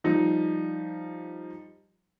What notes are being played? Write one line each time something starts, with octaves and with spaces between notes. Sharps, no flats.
F3 G3 D#4